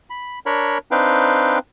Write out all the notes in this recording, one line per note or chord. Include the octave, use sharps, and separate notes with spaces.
B5
D4 A#4 C#5 B5
C4 D4 D#4 B4 F5 G5